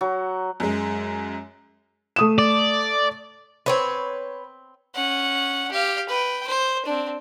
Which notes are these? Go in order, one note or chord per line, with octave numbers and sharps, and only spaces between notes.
F#3
F#2 G#3
A3 D#6 E7
D5
B3 C4 B4 C#5
C#4 F#5
G4 F5
B4 G5
C5
C4 D4